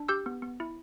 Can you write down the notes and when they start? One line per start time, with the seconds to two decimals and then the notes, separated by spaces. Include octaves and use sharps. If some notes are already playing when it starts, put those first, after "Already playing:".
Already playing: D4
0.08 G4 E6 G6
0.26 B3
0.42 B3
0.60 E4